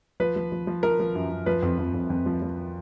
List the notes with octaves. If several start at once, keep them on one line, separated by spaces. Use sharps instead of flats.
F3 B4
F3
F3
F3
F3 A#4
F3
F#2
F#2
F3 B4
F2
F2
F2
F2
F3
F3